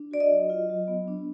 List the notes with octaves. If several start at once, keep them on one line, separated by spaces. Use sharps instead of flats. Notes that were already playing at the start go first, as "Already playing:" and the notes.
Already playing: D4
F#4 D5
D#5
F#3
F4
F#3
B3
D4